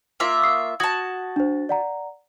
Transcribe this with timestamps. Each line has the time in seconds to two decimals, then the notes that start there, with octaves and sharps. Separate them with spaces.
0.20 A#3 F4 E5
0.42 C#6 D#6 C7
0.80 F#4 A5 D#6 G#6
1.36 D4 C5
1.69 D5 F#5 A#5